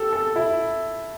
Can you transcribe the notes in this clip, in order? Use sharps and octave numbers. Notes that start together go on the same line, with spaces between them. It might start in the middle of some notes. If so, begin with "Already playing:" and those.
Already playing: G4 A4
A4
E4